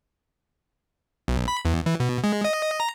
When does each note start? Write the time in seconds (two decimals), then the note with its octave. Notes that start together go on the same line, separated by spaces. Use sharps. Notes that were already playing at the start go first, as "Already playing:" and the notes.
1.28 B1
1.48 B5
1.65 E2
1.86 E3
2.00 B2
2.24 G#3
2.44 D#5
2.80 A#5